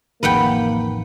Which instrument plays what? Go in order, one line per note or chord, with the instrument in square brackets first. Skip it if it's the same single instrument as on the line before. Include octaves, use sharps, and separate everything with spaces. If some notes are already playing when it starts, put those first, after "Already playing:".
[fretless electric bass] A1 F2 D#3 [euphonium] A#3 [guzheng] B4 F#5 G5